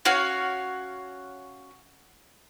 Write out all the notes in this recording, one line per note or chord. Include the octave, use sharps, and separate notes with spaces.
C#4 F#4 C#5 F5